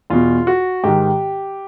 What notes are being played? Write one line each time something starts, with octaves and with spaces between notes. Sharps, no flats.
E2 B2 F4
F#4
G#2 D#3 G4